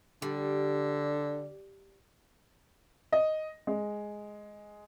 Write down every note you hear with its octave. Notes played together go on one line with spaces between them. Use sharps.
D3 G3
D#5
G#3